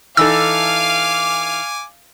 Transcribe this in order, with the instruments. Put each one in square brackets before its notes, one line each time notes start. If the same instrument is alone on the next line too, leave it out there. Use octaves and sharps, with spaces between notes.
[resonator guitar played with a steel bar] E3 D#4 A4 [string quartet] F5 F6 [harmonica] G#5 D6 [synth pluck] E6